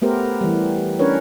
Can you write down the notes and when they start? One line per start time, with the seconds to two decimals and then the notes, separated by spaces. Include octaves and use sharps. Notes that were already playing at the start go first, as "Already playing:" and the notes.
0.02 A3 B3 G4 A#4 C5
0.41 E3 G3
0.99 C#4 D4 A#4 B4 C#5